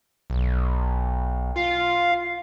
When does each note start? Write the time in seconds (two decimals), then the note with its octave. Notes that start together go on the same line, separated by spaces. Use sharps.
0.30 B1
1.56 F4 F5